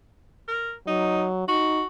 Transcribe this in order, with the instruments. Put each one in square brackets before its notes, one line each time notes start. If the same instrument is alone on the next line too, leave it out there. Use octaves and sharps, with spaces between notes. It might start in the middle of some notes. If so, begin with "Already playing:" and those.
[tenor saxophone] A#4
[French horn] F#3 [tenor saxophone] D#4
[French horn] D#4 [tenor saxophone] F#4